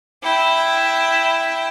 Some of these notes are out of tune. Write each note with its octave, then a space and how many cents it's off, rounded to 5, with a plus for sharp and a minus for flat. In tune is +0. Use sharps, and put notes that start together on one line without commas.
E4 +0 G5 +0